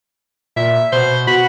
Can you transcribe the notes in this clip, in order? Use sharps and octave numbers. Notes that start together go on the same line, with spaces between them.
A#2 E5
B2 C5
F#4 B5